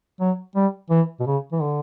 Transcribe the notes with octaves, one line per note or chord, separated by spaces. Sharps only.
F#3
G3
E3
B2
C#3
E3
D3